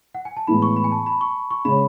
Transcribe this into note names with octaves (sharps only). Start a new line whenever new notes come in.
F#5
G#5
A5
A2 E3 G#3 B3 B5
C#6
B5
G#5
A5
B5
C#6
C#6
C#3 G#3 C#4 G#4 C#5 B5